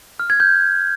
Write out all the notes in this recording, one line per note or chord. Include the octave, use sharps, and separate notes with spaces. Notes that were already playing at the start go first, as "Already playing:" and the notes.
F6
G#6
G6